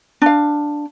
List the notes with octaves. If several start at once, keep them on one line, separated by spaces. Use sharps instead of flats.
D4 F5